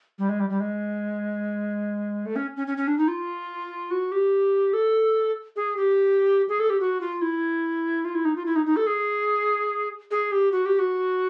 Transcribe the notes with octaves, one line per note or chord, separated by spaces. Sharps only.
G3
G#3
G3
G3
G#3
A3
C#4
C#4
C#4
C#4
D4
D#4
F4
F#4
G4
A4
G#4
G4
G#4
A4
G4
F#4
F4
E4
F4
E4
D#4
F4
E4
D#4
D#4
A4
G#4
G#4
G4
F#4
G4
F#4